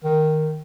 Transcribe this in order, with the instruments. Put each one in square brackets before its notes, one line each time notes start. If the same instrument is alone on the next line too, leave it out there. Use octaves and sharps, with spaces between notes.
[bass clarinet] D#3